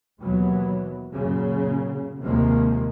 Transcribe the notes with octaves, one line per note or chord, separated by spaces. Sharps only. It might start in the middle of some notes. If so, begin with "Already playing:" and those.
D#2 B2 E3 F#3 B3
F#2 A#2 C#3 F#3
D#2 C3 D#3 F3 G#3 A#3